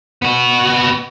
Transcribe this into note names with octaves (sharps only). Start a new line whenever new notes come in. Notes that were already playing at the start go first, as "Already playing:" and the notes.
B3 F#4